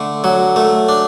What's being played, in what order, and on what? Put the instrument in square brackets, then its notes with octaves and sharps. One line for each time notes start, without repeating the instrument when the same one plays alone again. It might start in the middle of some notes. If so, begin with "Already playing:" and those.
Already playing: [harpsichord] D3 A3
F#3
A3
D4